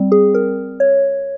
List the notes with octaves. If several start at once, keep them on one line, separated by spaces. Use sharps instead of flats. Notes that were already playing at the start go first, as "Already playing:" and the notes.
Already playing: G3 C4
G#4
A#4
C#5